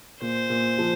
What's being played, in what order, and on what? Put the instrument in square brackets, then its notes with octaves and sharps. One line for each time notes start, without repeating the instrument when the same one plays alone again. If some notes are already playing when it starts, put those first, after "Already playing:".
[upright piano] A#2 [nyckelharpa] C5
[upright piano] A#2
F3